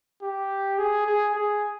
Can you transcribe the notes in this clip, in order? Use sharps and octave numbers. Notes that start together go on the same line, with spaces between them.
G4
G#4
G#4
G#4